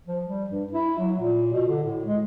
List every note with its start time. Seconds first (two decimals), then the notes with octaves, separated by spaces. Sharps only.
0.07 F3
0.27 G3
0.50 G2
0.73 E4
0.99 F#3
1.20 A#2
1.53 B2
1.68 D3
1.84 A2
2.06 G#3